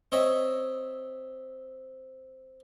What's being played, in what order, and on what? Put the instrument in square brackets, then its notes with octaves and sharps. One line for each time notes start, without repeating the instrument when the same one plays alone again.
[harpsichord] C4 C#5 D#5 E5